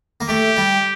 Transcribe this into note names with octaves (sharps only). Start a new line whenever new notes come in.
A#3
A3 G4
G3